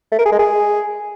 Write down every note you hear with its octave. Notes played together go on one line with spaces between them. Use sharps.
A3
A#4
G#4
G#3
G#4